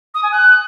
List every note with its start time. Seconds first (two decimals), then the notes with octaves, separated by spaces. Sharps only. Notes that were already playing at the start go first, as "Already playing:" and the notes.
0.14 D#6
0.23 G#5
0.32 F#6